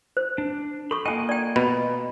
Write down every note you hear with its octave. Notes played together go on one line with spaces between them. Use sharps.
C5
D4
A4 B5 C#6
A#3 F4 D#5 G5 G#5
D5 G5
B2 B5